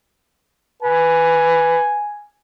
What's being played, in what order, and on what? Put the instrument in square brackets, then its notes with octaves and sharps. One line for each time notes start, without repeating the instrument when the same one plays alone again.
[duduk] B4 [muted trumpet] G#5